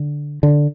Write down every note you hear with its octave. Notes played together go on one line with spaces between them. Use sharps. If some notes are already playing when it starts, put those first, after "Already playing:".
Already playing: D3
D3